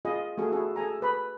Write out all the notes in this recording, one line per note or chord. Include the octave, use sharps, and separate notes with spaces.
F4 G#4 D#5
A3 F#4 G#4 A4
E4 F#4 G#4 A4
G#4 A4 G#5 A#5
A4 B4 B5